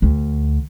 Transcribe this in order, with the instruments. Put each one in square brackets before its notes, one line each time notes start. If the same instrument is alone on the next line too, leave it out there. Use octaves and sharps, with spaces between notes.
[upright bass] D2